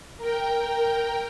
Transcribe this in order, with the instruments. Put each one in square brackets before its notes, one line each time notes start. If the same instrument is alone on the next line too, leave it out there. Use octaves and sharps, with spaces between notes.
[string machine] A#4 G5